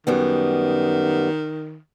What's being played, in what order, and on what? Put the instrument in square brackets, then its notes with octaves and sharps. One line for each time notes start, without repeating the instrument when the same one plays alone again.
[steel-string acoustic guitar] F#2 G3 B3 [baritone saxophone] D#3